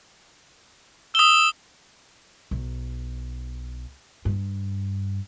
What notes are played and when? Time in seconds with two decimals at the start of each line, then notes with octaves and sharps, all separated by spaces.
1.15 D#6 E6 G7
2.51 B1
4.25 G2